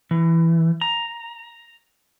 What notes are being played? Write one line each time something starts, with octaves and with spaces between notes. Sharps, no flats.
E3
A#5